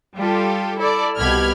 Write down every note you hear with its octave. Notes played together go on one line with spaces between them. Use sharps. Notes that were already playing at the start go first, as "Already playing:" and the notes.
G3 F4 G4 A4
E4 A4 D5
C2 B2 G4 B5 F6 G#6